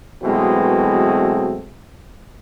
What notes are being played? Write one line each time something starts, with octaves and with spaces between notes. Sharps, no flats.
B2 E3 F#3 G#3 A3 C4